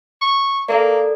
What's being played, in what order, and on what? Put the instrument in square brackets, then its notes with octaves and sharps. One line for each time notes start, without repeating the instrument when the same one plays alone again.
[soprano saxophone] C#6
[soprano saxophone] A#3 [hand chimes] A4 A#4 D5